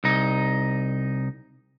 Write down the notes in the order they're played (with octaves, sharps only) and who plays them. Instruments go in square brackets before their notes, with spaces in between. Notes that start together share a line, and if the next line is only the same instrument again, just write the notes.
[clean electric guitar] C2 D#4